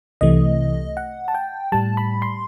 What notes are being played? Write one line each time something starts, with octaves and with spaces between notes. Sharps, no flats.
C2 C3 E3 A3 D#5
F#5
A5
G5
A2 G3 A5
B5
C6